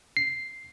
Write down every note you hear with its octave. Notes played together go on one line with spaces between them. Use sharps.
C7